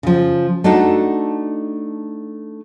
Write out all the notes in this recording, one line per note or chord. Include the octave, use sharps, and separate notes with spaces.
C#3 F3
A3 D4 D#4 F#4 A4